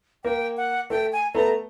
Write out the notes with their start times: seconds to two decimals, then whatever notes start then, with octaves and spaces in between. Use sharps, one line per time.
0.24 A#3 G5
0.57 F#5
0.90 A3 G5
1.12 G#5
1.34 A3 B3 A#5